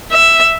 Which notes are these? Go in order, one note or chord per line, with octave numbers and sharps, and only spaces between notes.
E5